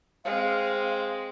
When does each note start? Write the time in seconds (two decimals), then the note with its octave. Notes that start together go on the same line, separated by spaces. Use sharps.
0.25 G#3 C4 F5